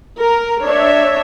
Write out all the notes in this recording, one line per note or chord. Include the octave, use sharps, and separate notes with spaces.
A#4
D4 C#5 E5